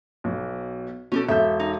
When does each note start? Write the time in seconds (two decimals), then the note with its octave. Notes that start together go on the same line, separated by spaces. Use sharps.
0.24 B1 B2
1.12 B2 C#4 G4 A4
1.28 E1 A4 E5 G6
1.60 D#4